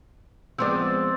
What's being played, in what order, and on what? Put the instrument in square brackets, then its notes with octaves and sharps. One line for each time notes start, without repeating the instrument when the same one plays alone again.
[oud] F3 G#3 B3 [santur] C4 D5